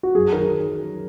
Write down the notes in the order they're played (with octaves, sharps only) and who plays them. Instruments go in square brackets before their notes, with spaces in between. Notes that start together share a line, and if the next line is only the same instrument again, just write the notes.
[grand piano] F#4
[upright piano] F#2 [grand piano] G#4
[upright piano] D#3 [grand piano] A#4